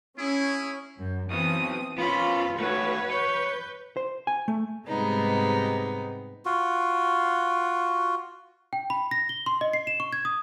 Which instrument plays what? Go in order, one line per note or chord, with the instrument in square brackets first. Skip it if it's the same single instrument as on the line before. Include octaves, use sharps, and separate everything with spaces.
[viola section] C#4 [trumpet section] E4 G#4
[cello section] F#2
[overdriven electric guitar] B1 B3 [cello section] E3 [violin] C4 D#6
[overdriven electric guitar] B3 C#4 [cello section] F4 [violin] B5
[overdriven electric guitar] D#3 A3 [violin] F#4 C#5 [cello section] B4
[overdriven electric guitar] C#5 [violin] G6
[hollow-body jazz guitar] C5
G#5
A3
[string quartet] G#2 C3 G3 G#3 B3 D#4
[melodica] F4 F#4
[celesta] G5
B5
A#6
G7
C6
D#5
C7
E7
C#6
G#6
D#6